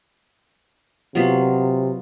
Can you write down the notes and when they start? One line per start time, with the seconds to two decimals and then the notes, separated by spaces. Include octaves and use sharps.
1.15 C3 F#3 B3 F4